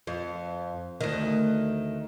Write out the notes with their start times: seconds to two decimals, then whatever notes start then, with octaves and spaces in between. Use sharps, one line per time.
0.07 F2
1.01 D2 D#3